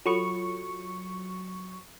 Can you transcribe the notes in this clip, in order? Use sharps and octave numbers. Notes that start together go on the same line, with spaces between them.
F#3 F4 A4 B5 C#6